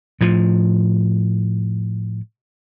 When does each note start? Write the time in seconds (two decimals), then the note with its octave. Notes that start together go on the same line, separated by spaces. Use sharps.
0.21 A2 F3